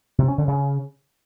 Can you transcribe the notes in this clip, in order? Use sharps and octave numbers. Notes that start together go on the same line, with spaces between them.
C3
C#4
D3
C#3